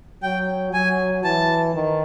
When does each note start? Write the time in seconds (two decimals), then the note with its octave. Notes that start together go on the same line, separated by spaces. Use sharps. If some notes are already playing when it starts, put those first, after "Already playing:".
0.23 F#3 G5
0.73 F#3 G#5
1.24 E3 A5
1.75 D#3